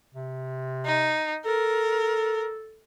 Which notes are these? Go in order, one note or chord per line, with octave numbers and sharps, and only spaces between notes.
C3
D#4
A4 A#4